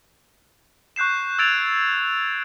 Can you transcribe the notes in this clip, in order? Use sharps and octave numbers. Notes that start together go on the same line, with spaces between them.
C#6 F#6 G6 C7 E7
E6 G#6 A6 D7 F7